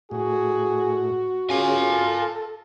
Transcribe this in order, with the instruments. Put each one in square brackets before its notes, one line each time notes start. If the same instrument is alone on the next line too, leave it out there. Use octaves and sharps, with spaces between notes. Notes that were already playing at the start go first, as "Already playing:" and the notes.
[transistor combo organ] A2 [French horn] F#4 [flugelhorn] G#4
[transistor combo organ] C#4 G#4 [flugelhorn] F4 [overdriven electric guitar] A#4 G#5
[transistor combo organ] A4